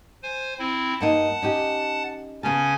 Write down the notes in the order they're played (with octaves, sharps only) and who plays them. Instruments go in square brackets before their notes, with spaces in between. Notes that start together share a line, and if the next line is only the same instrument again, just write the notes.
[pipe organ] C5 G#5
C4 E4
[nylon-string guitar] G2 A#3 D#4 [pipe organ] F#5 A5
[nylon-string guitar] C#4 D#4 G4
[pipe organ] C#3 C#4 G#5 [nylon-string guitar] B3 A5